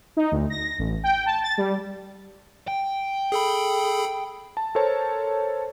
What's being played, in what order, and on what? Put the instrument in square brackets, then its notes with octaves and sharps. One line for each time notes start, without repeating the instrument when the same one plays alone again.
[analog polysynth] D#4
D2
A#6
A1
G5
A5
A6
G3
[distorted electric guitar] G5
[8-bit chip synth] G#4 A4 B5
[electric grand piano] A5
A4 A#4 C5 C#5 A5